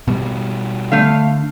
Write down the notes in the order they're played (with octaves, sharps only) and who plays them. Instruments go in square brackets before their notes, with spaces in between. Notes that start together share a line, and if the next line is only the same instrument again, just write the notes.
[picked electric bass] B2 G3
[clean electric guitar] D3 [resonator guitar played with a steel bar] A3 F5